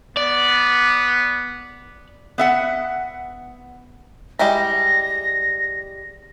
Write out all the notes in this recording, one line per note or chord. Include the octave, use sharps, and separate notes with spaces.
B3 D5
B3 E5 F#5
G3 G#3 E4 A#6